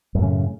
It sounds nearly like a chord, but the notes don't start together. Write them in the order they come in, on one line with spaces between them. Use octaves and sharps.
F#2 A2 C#3